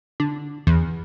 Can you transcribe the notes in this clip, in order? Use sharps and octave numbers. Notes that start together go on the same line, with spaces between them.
D3
E2